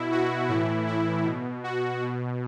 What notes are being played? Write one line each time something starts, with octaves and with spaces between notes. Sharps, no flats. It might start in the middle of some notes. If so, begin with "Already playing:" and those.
Already playing: B2 E4
F#4
A2 E3 E4
E4
B2
F#4
B2